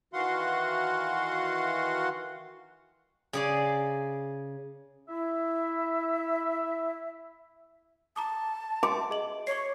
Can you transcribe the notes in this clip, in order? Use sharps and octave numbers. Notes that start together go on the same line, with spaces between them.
D#3 E3 F#4 F5 F#5 C6
C#3 G#4 D5
E4 E5
A5 A#5 D6 D#6
G#5 C6 D6
G#4 D#5 F#7
C#5 C#6 C7